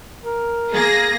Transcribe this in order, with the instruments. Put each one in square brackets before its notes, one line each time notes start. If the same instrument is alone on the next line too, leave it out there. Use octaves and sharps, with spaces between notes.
[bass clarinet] A#4
[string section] A#3 G#4 A#6